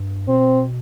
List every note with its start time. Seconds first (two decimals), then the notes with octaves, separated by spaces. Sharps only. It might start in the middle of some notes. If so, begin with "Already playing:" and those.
Already playing: G2
0.28 B2 C4